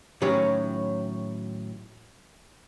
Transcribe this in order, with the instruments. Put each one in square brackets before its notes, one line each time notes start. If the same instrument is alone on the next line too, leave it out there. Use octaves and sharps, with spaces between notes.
[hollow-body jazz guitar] A2 D#3 F#3 C#4 C#5